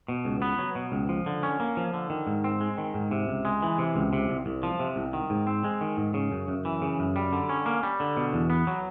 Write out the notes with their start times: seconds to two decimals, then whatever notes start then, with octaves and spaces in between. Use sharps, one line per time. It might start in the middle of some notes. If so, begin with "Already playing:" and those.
0.08 B2
0.25 C#2
0.42 B3
0.59 F#3
0.75 B2
0.92 C#2
1.09 F3
1.26 D3
1.43 C#4
1.60 A#3
1.77 F3
1.94 D3
2.10 D#3
2.27 G#2
2.44 C4
2.61 G#3
2.78 D#3
2.94 G#2
3.11 C3
3.28 C#2
3.45 G#3
3.62 E3
3.78 C3
3.96 C#2
4.13 C3
4.29 C2
4.46 C2
4.63 F3
4.80 C3
4.96 C2
5.13 D#3
5.30 G#2
5.47 C4
5.64 G#3
5.81 D#3
5.97 G#2
6.14 C#3
6.32 F#2
6.48 F#2
6.65 E3
6.82 C#3
6.99 F#2
7.16 G3
7.33 D3
7.49 C#4
7.66 A#3
7.83 G3
8.00 D3
8.17 B2
8.33 E2
8.50 B3
8.67 F#3